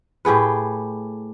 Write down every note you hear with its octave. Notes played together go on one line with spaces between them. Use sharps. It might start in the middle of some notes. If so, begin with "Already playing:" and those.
A2 G4 G#4 B4